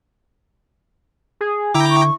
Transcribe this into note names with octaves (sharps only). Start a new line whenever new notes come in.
G#4
D3 E4 G5 A#5 D6
C#6